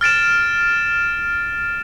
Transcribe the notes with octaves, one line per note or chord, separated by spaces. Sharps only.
F6 A6 D7 E7